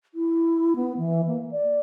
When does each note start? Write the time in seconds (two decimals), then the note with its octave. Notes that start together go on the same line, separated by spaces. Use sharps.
0.14 E4
0.76 B3
0.98 E3
1.28 A#3
1.51 D5